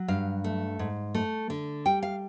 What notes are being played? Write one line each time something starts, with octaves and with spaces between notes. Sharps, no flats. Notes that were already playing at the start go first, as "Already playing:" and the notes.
Already playing: F#3
G2 F5
A3
G#2
A3
D3
G3 G5
F5